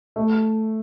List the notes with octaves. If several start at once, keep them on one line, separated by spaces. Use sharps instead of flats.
A3